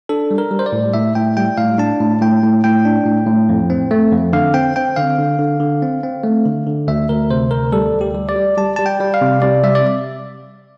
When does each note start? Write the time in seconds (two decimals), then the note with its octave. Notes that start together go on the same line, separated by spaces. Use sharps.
0.09 D4 A4
0.31 G3
0.38 A#4
0.51 G3
0.59 C5
0.66 D5
0.72 A2
0.94 A2 E5
1.15 A2 G5
1.37 G3 G5
1.58 A2 F5
1.78 D4 A5
2.00 A2
2.21 A2 G5
2.43 A2
2.64 A2 G5
2.85 D4
3.06 A2
3.27 A2
3.49 F2
3.70 C4
3.91 A3
4.12 F2
4.33 D3 F5
4.54 C4 G5
4.76 C4 G5
4.96 D3 F5
5.19 D3
5.39 D3
5.60 D3
5.82 C4
6.03 C4
6.24 A3
6.45 D3
6.66 D3
6.87 D2 E5
7.09 D2 A#4
7.30 C3 C5
7.51 D2 A#4
7.72 G3 A4
7.94 D2
8.01 G4
8.15 G3
8.29 D5
8.36 G3
8.58 G3 A5
8.76 G3 A5
8.86 G5
9.00 G3
9.14 F5
9.21 C3
9.42 C3 D5
9.63 G3 E5
9.75 D5